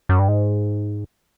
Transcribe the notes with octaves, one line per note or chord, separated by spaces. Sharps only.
F#2
G2
G#2